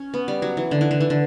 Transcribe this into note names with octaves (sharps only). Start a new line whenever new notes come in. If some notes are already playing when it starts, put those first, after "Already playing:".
Already playing: C#4
B3
G3
F#3
E3
D3
E3
D3
E3
D3